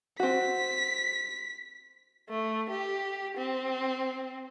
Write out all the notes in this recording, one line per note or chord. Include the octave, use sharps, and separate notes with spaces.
C4 F#4 B6
A3
G4
C4